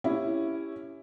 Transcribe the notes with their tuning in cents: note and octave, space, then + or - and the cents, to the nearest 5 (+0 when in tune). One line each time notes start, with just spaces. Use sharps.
C#4 +0 E4 +0 G4 +15